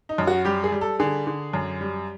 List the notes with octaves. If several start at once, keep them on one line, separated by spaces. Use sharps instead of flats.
D#4
F#2
F#4
G3 G4
G#4
G3
A4
D3 G#4
D3
F#2
G3